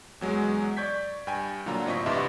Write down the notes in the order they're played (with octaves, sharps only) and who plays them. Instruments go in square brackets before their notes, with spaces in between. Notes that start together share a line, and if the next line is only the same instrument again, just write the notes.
[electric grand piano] E2 F#3 G#3
D5 C#6 G6 G#6 B6
G2 G5 G#5
A#2 D3 F#3 D4 F4 A#5
A2 C4 D#5 C#6 B6
C2 G2 E3 G4 E5 C6